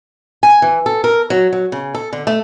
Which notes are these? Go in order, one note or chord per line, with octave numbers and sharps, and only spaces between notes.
G#5
E3
A4
A#4
F#3
F#3
C#3
A4
D3
A3